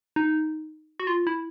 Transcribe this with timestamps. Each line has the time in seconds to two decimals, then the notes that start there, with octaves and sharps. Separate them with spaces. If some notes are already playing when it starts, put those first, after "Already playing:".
0.16 D#4
1.00 F#4
1.07 F4
1.27 E4